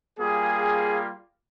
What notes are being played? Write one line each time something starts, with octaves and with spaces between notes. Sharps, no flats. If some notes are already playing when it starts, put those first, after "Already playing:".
G3 A#3 F4 G#4